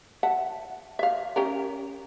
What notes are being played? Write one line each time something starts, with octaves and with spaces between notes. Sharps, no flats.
E5 F#5 A5
E5 F5
C#4 G4 A#4